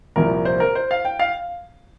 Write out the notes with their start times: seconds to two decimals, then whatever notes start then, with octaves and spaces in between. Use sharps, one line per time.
0.16 C2 A#2 F3 A#3 A#4
0.45 C5
0.60 A#4
0.75 C5
0.91 F5
1.05 G5
1.19 F5